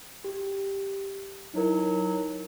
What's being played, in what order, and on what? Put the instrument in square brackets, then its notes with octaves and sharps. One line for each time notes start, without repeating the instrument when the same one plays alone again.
[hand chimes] G4
[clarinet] F#3 [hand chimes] D#4 E4 A#4